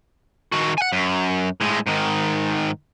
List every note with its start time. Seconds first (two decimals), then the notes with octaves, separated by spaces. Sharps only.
0.52 D#3 F#4
0.78 F#5 G#5
0.92 F#2
1.61 A2 G#3
1.87 G#2 D#3